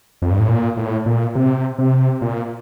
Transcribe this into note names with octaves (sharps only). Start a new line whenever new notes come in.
F2
G2
A2
A#2
A2
A#2
C3
C3
A#2